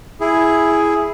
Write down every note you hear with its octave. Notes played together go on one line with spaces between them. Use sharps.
E4 G#4